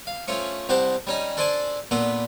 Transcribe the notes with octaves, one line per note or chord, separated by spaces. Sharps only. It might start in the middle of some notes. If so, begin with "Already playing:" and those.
F5
F3 A3 C#4 C#6
C2 F#4 G4 C5 A5
G3 C#4 D#4
D4 A4 C5 D5 G#5 A5
A#2 B3 D4 A4